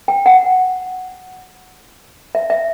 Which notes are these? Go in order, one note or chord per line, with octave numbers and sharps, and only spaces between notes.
G5
F#5
E5
E5